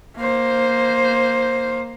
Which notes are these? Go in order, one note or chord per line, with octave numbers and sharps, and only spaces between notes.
A#3 C5